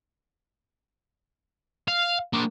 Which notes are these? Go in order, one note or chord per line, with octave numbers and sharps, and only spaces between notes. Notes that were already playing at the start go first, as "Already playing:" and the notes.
F5
A#3 D4